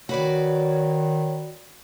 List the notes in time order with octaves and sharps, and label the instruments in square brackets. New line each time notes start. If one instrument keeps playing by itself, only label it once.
[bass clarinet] D#3 [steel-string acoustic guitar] F#4 B4 D5 [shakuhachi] C#5